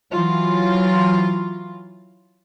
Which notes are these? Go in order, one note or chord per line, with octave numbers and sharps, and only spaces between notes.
E3 F#3 F4